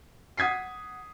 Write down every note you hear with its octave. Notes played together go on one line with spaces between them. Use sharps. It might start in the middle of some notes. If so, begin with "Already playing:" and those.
F#5 D#6 G#6 B6 C7